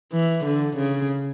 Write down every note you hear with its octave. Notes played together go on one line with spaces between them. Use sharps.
E3
D3
C#3